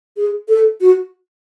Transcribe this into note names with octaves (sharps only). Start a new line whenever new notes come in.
G#4
A4
F#4